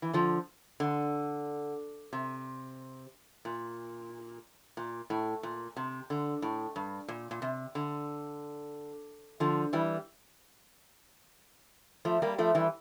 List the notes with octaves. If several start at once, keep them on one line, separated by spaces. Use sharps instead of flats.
E3
D3 F3
D3
C3
A#2
A#2
A2
A#2
C3
D3
A2
G2
A#2
A#2
C3
D3
D3 F3
E3 G3
F3 A3
G3 A#3
F3 A3
E3 G3